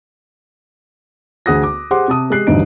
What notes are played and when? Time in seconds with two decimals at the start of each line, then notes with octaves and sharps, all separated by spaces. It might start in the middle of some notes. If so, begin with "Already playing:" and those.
1.46 D2 G#4 F#5 D#6 F#6 A#6
1.63 D6
1.91 G4 G#4 C5 F#5 C6 D6
2.08 C3 A5 D#6
2.30 G#3 G4 F#6 C7
2.47 A1 D2 G2 D#4 D#5 D7